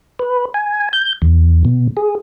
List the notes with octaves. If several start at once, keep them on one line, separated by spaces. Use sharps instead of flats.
B4
G#5
G6
E2
B2
G#4